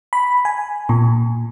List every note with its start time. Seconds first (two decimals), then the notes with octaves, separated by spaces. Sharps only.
0.13 B5
0.45 G#5
0.89 A#2